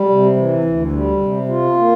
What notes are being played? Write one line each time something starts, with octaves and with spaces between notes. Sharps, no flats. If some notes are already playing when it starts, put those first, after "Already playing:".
Already playing: G3
C3
E3
D2
G3
C3
F4
A#3